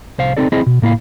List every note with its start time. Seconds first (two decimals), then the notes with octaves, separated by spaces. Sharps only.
0.18 C2 C5 F5
0.37 C4 D#4 A4 D5
0.52 C4 E4 G#4 C5 D#5
0.66 B2
0.82 A2 A#3 E4 F5